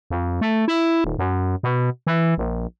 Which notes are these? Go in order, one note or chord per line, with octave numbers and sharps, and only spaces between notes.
F2
A3
E4
D#1
F#2
B2
E3
A#1